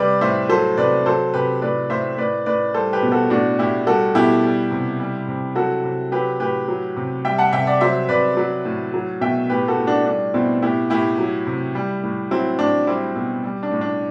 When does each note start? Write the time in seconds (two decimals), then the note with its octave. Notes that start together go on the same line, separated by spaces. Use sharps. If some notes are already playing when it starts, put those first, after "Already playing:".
Already playing: C3 G3 B4 D5
0.21 A2 C5 E5
0.49 F#3 A4 C5
0.77 C3 B4 D5
1.06 F#3 A4 C5
1.34 C3 G4 B4
1.62 A2 B4 D5
1.90 A2 C5 E5
2.18 A2 B4 D5
2.46 A2 B4 D5
2.74 G3 A4 C5
2.93 G4 B4
3.03 B2
3.12 F#4 A4
3.30 A2 D4 F#4
3.59 A2 E4 G4
3.87 G3 F#4 A4
4.15 B2 E4 G4
4.43 G3
4.71 C3
5.00 G3
5.28 C3
5.55 F#3 F#4 A4
5.84 C3
6.12 F#3 G4 B4
6.40 A2 G4 B4
6.68 F#3
6.97 C3
7.25 G3 E5 G5
7.38 F#5 A5
7.52 C3 E5 G5
7.67 D5 F#5
7.81 F#3 C5 E5
8.09 C3 B4 D5
8.37 F#3
8.65 A2
8.94 F#3
9.21 B2 E5 G5
9.50 A2 G4 B4
9.68 F#4 A4
9.78 A2
9.87 D4 F#4
10.06 G3 D4
10.34 B2 C4 E4
10.62 A2 E4 G4
10.90 A2 E4 G4
11.19 F#3
11.47 C3
11.75 G3
12.03 A2
12.31 F#3 C4 E4
12.59 A2 D4
12.87 G3 C4 E4
13.15 B2 C4
13.43 G3
13.63 D4
13.71 A2
13.81 D4